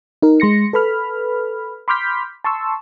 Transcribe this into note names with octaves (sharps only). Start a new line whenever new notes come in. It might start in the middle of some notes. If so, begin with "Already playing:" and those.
D#4 A#4
G#3 C6 A#6 C#7
A4 B4 B5 F6
B5 C6 D6 F6 G6 B6
A5 C6 C#6 E6